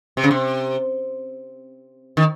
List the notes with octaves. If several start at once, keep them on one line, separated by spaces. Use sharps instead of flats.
C3
C#3
C3
D#3